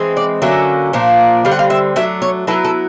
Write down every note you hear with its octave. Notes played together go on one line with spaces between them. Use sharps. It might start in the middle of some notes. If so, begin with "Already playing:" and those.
Already playing: E3 G#3 C4
D5
D3 F#3 A#3 C#4 E5
A#2 F3 A#3 D4
D3 G3 C4 F5
F#5
F5
E5
F#3 A3 D4 E5
C#5
F#3 B3 E4 A4
A4